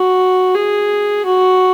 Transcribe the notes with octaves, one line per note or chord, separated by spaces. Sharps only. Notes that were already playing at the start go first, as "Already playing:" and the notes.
Already playing: F#4
G#4
F#4